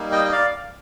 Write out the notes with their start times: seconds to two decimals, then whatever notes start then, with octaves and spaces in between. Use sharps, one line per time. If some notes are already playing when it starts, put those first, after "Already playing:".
Already playing: G3 A#3 D#4
0.12 D#5 G5
0.24 D#5
0.32 D5 F5